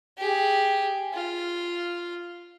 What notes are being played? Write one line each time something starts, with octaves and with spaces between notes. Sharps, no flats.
G4 G#4
F4